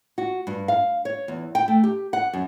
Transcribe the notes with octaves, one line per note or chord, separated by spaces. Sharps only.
F#4
G2
F5
C#5
E2
G5
A3
G4
F#5
F#2